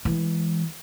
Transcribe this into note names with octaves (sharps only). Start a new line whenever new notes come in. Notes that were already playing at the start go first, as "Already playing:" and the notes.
E3 G#3